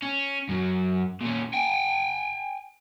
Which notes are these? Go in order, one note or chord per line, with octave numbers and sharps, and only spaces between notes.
C#4
F#2 F#3
A#2 C#4
G5 G#5